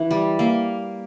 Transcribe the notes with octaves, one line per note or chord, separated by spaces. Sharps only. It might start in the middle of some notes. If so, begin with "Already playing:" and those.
Already playing: E3
G3
A#3